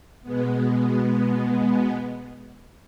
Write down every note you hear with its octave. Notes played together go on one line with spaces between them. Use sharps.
B2 G#3 B3